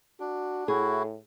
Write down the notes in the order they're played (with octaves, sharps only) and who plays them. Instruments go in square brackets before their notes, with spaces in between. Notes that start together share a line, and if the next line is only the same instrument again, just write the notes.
[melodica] D4 [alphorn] F#4
[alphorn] A2 [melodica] E4 F#4 [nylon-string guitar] G#4